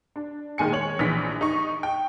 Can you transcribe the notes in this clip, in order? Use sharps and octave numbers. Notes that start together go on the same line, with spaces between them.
D4
A#2 D#3 G#3 G#5 C#7
C#5 F#7
A#1 E3 B6
D#4 C#6
G5